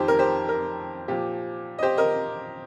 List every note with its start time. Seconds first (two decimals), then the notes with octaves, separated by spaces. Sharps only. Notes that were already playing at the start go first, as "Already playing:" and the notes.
Already playing: F2 D#3 G4 C5
0.08 A#4
0.19 G4 C5
0.49 A#4
1.08 A#2 F3 G4
1.79 D#5
1.82 G4 C5
1.97 A#4 D#5